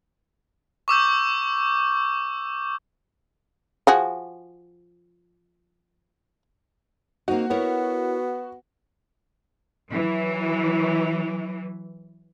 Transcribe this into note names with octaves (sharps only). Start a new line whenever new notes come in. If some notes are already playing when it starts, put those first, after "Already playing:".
C#6 D6 E6 G6
F3 F#4 G#4
A#3 C4 D#4 F#4
B3 E4 A#4 C#5
E3 F#3